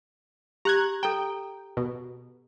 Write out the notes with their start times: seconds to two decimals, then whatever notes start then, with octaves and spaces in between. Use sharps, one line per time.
0.65 G4 A#5 F#6 G#6
1.03 A4 G5 A#5
1.77 B2